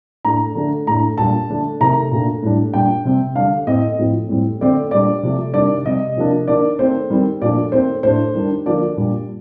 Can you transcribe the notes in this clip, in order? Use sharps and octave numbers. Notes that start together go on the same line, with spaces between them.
A2 A3 D4 A#5
D3 A3 D4
A2 A3 D4 A#5
A#2 G3 D4 A5
D3 A3 D4
C3 D#3 A3 A#5
A#2 A3 D4
A2 G3 D4
A#2 G3 D4 G5
C3 G3 C4
D3 G3 D4 F5
A2 A3 C4 D#5
A2 F3 C4
A2 G3 C4
D3 A3 C4 D5
A#2 G3 D4 D5
C3 F3 A3
C3 D#3 G3 D4 D5
C3 G3 C4 D#5
C3 F3 A#3 D4
D#3 A#3 D4 D5
D#3 A3 C4 C5
D#3 G3 C4
A#2 F3 A3 D4 D5
D#3 A3 C4 C5
A2 A3 D4 C5
D#3 G3 D4
D3 F3 A#3 D4 D5
A#2 G3 D4